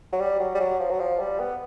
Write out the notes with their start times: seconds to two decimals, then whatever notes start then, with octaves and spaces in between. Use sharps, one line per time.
0.13 F#3
0.20 G3
0.40 F#3
0.55 G3
0.60 F#3
0.80 F3
0.90 F#3
1.00 F3
1.20 G3
1.40 B3